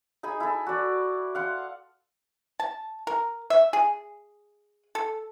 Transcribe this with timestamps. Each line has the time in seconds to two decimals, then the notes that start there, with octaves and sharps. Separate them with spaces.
0.23 D#4 G#4 G#5 B5
0.40 E4 A4
0.66 F#4 D5
1.35 F5 F#5 C6
2.60 A5
3.07 A#4
3.50 E5
3.73 G#4
4.95 A4